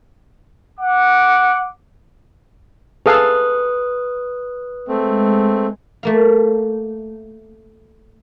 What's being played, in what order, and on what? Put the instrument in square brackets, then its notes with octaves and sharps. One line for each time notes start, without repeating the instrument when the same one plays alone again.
[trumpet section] F#5 D6
[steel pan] G#4 A4 F5 [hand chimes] B4 D#6 F#6
[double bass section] G#3 [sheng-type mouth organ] A3 C4
[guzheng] A3 A#3 F5